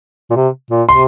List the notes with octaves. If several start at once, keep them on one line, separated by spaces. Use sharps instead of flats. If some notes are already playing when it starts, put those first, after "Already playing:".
A#2
C3
A#2
C3 C6